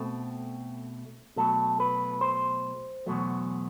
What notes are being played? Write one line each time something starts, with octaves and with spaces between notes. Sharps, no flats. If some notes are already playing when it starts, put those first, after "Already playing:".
Already playing: B2 A3 C4
B2 F#3 A3 A4
B4
C5
E2 B2 F#3 A3